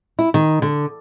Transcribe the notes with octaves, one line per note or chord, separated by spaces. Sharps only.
E4
D#3
D3